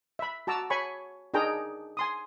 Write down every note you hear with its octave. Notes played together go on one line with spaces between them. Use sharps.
E5 B5
F#4 A5 A#5 D6 E6
C#5 G#5 B5 C#6
D4 D#4 G#4 A#4 G5 A#5
G#5 C6 D#6